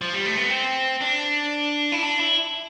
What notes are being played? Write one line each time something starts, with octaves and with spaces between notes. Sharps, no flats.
F3
G3
A3
B3
C4
D4
E4
D4
E4